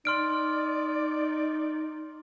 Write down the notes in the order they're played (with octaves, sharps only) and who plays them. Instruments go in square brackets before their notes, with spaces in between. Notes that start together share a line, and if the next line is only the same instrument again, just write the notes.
[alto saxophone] D#4 [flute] D5 [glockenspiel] C6 F6 D7